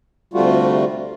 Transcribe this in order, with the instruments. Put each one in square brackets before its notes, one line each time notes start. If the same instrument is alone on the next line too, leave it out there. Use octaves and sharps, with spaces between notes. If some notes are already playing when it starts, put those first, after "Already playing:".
[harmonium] D2 C3 G3 A3 F4 F#4